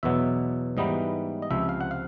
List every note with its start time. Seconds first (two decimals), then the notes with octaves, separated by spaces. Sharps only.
0.03 E2 B2 F#3 E5
0.77 G#2 E3 G3 B3 D#4 D#5
1.42 D#5
1.51 C#2 C3 F3 E5
1.69 F5
1.81 F#5
1.91 F5